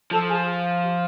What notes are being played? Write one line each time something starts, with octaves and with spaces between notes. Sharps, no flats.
F3 A4 A5
G#4 G#5
G4